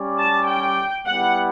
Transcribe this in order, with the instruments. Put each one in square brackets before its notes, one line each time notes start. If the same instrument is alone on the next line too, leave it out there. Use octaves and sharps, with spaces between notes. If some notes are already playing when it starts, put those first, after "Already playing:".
Already playing: [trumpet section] G3 C#4 G4 D5
[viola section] A5
G5
[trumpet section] G3 B3 E4 G4 [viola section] F#5